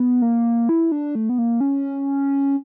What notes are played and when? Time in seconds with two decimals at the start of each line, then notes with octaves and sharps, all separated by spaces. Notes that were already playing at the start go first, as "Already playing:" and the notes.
Already playing: B3
0.22 A#3
0.69 E4
0.92 D4
1.15 A3
1.29 B3
1.38 A#3
1.61 C#4